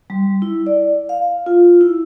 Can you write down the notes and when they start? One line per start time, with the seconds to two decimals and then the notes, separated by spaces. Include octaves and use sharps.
0.10 G3
0.42 E4
0.67 D5
1.09 F5
1.46 F4
1.81 E4